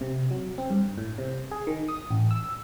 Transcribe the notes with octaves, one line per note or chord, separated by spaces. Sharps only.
C3
F#3
C4
G2
A2
C3
G#4
D#3
D#6
A1
E6